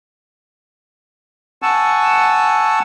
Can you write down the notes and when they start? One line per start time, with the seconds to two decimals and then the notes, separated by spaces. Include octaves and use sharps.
1.62 F#5 G#5 A5 C#6 E6